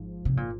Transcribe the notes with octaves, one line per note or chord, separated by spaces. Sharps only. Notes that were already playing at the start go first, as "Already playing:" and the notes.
Already playing: G#1 G#2 F3
C3
A#2